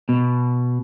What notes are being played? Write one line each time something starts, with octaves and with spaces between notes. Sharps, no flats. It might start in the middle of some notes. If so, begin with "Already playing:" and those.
B2